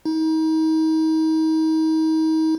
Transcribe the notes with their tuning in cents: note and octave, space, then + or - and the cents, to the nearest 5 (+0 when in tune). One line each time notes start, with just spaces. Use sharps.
D#4 +35